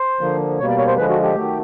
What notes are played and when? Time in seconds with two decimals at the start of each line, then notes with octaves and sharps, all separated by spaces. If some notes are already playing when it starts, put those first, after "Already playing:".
Already playing: C5
0.21 D3 F3 A#3
0.59 B2 G3 A#3 C#5
0.69 D5
0.78 C#5
0.87 C5
0.97 D3 F3 G#3 B4
1.09 F#4
1.23 G4
1.35 D#3 F#3 A3